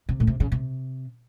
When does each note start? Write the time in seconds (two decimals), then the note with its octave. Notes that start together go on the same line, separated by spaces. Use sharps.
0.09 C3
0.20 A2
0.27 C3
0.40 C#3
0.52 C3